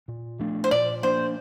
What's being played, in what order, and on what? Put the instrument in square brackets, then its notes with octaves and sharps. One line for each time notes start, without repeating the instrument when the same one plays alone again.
[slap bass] A#2
F3 A3 D4
[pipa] C5
[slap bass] A#2 [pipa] D5
[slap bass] F3 A#3 D4 [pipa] C5